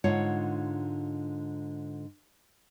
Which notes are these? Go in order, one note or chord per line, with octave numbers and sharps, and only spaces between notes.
G#2 D3 F4 C#5 F#5